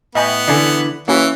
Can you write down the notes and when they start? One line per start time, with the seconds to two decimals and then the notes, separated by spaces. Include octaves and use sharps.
0.15 A2 B3 D#5 G5 G#5
0.48 D3 E3 D5 G#5
1.08 E3 A#3 C#4 F#4 C#5